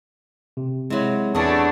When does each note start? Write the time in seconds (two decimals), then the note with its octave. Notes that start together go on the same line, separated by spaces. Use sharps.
0.57 C3
0.90 C3 F#3 G#3 E4
1.35 E2 A3 B3 D4 F#4 G#4 A5